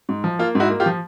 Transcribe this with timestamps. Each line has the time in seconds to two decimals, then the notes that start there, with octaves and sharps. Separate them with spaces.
0.09 G#2
0.24 F3
0.39 A#3 F4
0.55 G#2 E4 F#4
0.70 A#3
0.80 F4 G4
0.86 F3